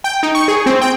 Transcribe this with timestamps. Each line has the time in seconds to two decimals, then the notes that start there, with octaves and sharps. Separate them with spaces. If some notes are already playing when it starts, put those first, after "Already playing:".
0.04 G5
0.23 D#4
0.35 C#6
0.48 G#4
0.66 C4
0.81 G5